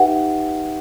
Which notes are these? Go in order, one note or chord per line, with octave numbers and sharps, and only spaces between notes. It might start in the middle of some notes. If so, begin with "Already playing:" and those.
Already playing: D#4 G4 B4 E5 F#5 G5